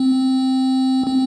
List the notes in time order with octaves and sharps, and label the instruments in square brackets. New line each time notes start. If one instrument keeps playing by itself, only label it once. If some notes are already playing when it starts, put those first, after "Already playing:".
Already playing: [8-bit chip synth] C4
C4